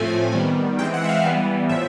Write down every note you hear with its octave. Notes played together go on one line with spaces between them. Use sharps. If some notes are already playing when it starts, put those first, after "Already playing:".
Already playing: A2 F3 A3 C4 G#5
D#3 G3 B3
E3 G#3 C4 G5
F#5
E5
F5
E3 G3 B3
A2 F3 E5